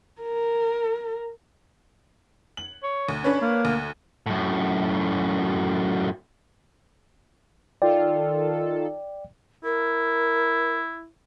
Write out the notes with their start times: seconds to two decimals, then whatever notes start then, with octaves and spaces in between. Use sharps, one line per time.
0.22 A#4
2.57 F#7
2.84 C#5
3.09 D2
3.24 C#4 D4 B4 C#5
3.42 A#3
3.65 D2
4.26 F#2 A2
7.82 D#3 F4 A4 D5 G5
9.64 E4 A#4